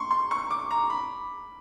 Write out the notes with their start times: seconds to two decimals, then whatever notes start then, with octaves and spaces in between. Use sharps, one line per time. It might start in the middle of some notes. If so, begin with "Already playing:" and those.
Already playing: C6 C#6
0.11 C6
0.31 C#6
0.50 D6
0.71 A#5
0.90 B5